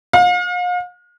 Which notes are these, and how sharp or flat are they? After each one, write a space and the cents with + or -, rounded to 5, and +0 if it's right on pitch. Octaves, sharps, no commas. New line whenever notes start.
F5 +40